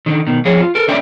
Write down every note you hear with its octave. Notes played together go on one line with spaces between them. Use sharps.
D3 D#3
B2 D#3
F2 F3 G#4 C#5
F4
A4 A#4
D3 C#4 D5 E5 G5